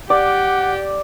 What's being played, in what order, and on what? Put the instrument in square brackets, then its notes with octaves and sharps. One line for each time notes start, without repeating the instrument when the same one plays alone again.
[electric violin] G4 [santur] D5 [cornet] F#5